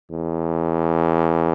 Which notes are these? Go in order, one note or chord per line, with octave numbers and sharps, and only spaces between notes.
E2